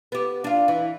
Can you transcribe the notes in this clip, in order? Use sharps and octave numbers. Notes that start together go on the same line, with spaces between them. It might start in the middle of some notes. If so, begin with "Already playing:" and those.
B3 G4
D4 F4
E3